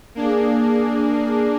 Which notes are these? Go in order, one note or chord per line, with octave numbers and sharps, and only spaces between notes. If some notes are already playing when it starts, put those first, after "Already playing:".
A#3 D4 G#4